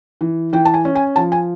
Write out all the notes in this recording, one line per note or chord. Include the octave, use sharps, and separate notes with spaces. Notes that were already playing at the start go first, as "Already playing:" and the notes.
E3
E3 G5
A5
G#5
C#4
G#5
F3 A5
G#5